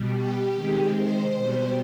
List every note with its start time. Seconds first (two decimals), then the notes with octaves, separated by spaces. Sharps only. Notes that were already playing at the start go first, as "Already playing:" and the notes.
Already playing: B2 G3
0.15 G4
0.55 C3 D#3 G#3
0.96 C5
1.36 B2 G3